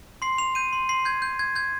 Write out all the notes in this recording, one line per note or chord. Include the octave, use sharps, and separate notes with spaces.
C6 C7
C6 F7
G6 D#7
C6
C6 C7
G6 G#6
G6
G6 G#6
G6 G#6